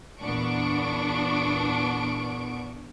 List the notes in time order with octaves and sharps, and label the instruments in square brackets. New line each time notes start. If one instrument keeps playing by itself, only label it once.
[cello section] E2 A#2 B3 [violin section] D4 C#6 D7